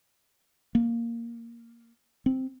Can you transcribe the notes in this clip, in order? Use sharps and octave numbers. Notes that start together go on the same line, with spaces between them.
A#3
C4